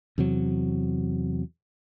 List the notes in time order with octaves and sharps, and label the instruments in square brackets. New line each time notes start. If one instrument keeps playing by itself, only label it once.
[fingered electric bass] E2 C3 F#3